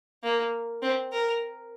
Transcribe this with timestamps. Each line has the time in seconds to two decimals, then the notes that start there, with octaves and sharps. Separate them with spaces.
0.23 A#3
0.82 C4
1.12 A#4